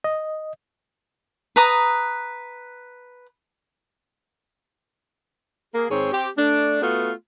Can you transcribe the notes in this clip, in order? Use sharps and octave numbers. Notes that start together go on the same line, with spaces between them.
D#5
B4 A#5 D#6
A#3 G#4
G#2 D#3 C4 G#4 C#5
C4 G4
A3 D4
A3 B3 F4 F#4